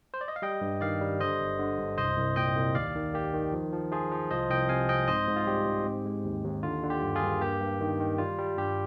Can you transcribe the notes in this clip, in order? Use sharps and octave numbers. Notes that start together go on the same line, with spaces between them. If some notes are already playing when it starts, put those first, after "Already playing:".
C5
D5
D#5
F5
G3 D#5 G5
G2
D#3 D5 F5
G3
D3 C5 D#5
G1
D3
G2
C2 C5 D#5
C2
A#2 D#5 G5
C2
D#2 D5 F5
D#3
A#3 G4
D#3
F3
F3
F3 F4 G#4
F3
C2 C5 D#5
C2 D#5 G5
C3 F5 G#5
C4 D#5 G5
G#2 C5 D#5
G#2
F4
G3 G4
G#2
C4
G#3
D#2
D#2
D3 F4
D3
G4
G2
F4 G#4
G2
A#3 G4
G2
D#3
D#3
G3 F4
G3
G2 G4